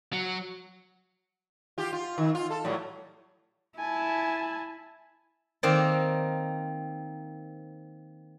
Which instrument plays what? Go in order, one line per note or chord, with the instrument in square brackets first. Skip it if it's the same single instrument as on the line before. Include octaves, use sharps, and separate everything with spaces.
[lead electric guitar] F#3
[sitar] F4 G4
F4
D#3
F4
A4
A2 F#3 G3
[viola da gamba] E4 [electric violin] G#5 A5
[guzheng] D#3 A#3 C4 D#4 D5